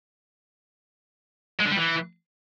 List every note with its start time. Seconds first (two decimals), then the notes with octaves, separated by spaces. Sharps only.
1.60 G#3
1.66 D3
1.72 G3
1.77 E3